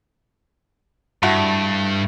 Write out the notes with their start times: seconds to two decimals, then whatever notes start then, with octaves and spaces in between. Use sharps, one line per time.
1.23 G2 A3 E4 F#4